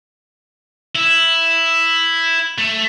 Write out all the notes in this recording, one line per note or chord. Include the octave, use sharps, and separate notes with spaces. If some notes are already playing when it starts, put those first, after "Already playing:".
E4
A3